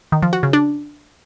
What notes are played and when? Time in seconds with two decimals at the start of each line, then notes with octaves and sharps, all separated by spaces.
0.12 D#3
0.23 F3
0.33 F#4
0.43 C#3
0.53 D4